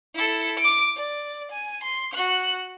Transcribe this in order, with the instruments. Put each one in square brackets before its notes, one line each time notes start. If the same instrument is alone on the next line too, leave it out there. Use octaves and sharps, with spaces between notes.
[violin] E4 A4
D6 D7
D5
G#5
C6
F#4 F#6